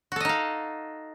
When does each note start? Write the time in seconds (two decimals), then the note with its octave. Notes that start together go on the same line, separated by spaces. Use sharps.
0.12 F#4
0.16 A4
0.20 D#5
0.25 D#4
0.29 F5